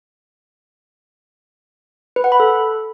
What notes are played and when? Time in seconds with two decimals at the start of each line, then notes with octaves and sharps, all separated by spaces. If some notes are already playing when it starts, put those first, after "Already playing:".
2.16 B4
2.24 F#5
2.32 B5
2.40 A4